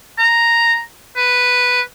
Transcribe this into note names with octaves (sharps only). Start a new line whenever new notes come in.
A#5
B4